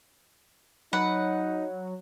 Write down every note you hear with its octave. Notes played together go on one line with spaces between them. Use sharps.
F#3 D#4 B4 F#5